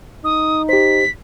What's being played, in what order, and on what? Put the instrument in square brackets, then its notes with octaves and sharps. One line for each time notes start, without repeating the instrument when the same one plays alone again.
[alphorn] D#4 [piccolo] D#6
[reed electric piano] G4 C5 [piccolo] B6